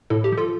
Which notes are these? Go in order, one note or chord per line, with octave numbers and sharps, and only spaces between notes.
A2 A4
G4
F3
F4 A4